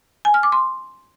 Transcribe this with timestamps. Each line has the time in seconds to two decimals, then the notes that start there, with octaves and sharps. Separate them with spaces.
0.25 G#5
0.34 F6
0.43 D6
0.52 C6